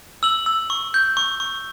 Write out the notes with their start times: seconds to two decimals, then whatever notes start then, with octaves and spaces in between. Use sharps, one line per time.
0.23 E6 F#7
0.46 E6
0.70 C#6
0.94 G6
1.17 C#6
1.40 C#6